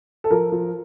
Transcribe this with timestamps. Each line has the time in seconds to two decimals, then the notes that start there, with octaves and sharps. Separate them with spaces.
0.24 A4
0.31 F3 A#4
0.52 F3